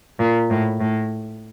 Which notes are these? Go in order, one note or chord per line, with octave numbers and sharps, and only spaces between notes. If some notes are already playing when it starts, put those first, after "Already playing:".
A#2
A2
A2